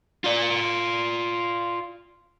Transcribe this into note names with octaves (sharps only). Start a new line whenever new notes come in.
F4 D5